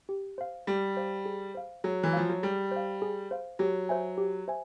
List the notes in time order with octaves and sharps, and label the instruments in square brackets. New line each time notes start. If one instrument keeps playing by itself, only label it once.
[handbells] G4
C5 F5
[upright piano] G3 [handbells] G4
[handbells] C5 F5
G#4
C5 F5
[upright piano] F#3 [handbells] G#4
[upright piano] E3
[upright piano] F3 [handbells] C5 F5
[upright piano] F#3
[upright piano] G3 [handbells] G#4
[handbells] C5 F5
G#4
C5 F5
[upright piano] F#3 [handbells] G4
[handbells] C5 E5 G#5
G4
C5 E5 G#5